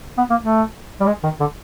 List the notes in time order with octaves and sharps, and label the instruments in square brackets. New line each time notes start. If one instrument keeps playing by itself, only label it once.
[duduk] B3
A#3
A3
G3
G#3
D#3
D3